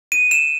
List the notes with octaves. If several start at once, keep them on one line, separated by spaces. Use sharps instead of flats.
D#7
E7